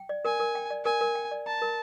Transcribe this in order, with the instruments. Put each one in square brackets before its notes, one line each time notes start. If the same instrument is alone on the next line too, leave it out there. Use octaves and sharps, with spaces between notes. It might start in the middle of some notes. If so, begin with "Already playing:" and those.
Already playing: [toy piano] G5
D5
[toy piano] A#4 [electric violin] G#5
[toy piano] A#4
G5
D5
[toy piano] A#4 [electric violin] G#5
[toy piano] A#4
G5
D5
[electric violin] A5 [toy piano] A#5
[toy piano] A#4